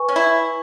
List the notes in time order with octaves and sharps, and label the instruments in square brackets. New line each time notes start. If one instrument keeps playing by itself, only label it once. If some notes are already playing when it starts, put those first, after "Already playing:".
Already playing: [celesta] B4 G#5 C#6
[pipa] C#4
E4